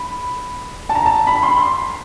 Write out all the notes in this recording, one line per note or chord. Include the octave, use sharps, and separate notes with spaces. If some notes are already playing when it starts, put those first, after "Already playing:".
Already playing: B5
A5
A#5
A5
B5
C6
C6